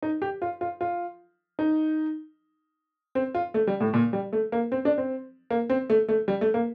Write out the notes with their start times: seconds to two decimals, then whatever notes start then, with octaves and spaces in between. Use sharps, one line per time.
0.02 D#4
0.22 G4
0.42 F4
0.61 F4
0.81 F4
1.59 D#4
3.15 C4
3.35 F4
3.54 A3
3.67 G3
3.80 A2
3.93 A#2
4.13 G3
4.33 A3
4.52 A#3
4.72 C4
4.85 D4
4.98 C4
5.50 A#3
5.70 C4
5.90 A3
6.09 A3
6.28 G3
6.41 A3
6.54 A#3